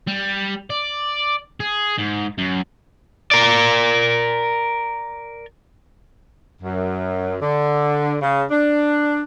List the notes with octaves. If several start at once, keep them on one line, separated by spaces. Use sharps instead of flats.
G3
D5
G#4
G#2
F#2
A#4 D5
F#2
D3
C#3
D4